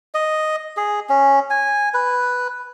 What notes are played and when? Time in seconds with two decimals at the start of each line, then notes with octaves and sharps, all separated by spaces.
0.14 D#5
0.77 G#4
1.09 C#4
1.50 G#5
1.94 B4